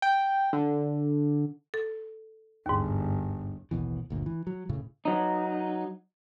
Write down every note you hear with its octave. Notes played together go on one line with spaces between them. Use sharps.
G5
D3
A4
G1 D#2 G#2
A1 D#2 B2 E3
G1 D2 A#2
E3
F#3
E1 A2 C#3 C#4
F#3 D#4